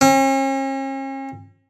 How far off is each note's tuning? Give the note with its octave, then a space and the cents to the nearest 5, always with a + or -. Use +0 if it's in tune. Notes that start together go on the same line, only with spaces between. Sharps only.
C#4 -45